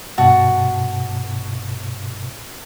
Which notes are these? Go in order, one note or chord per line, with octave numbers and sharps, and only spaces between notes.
G2 B2 F#4 A5